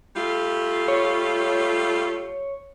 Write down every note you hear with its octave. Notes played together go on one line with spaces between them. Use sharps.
G3 A3 F4
C#5